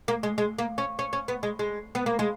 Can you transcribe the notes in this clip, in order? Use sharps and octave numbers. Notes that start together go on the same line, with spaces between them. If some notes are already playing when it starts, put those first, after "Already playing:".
A#3
G#3
G#3
A#3
C#4
C#4
C#4
B3
G#3
G#3
B3
A#3
G#3